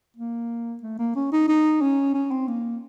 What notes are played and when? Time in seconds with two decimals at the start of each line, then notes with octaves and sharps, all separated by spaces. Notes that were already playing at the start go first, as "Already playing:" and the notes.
0.16 A#3
0.83 A3
0.99 A#3
1.16 C#4
1.32 D#4
1.49 D#4
1.81 C#4
2.14 C#4
2.31 C4
2.48 A#3